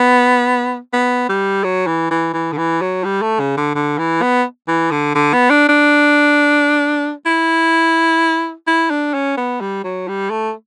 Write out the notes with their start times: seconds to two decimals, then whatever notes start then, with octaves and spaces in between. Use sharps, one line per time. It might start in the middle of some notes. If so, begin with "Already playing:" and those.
Already playing: B3
0.93 B3
1.29 G3
1.64 F#3
1.87 E3
2.11 E3
2.34 E3
2.53 D3
2.58 E3
2.82 F#3
3.04 G3
3.22 A3
3.40 C#3
3.57 D3
3.75 D3
3.98 E3
4.22 B3
4.68 E3
4.91 D3
5.15 D3
5.33 B3
5.50 D4
5.69 D4
7.26 E4
8.67 E4
8.90 D4
9.14 C#4
9.37 B3
9.61 G3
9.84 F#3
10.08 G3
10.31 A3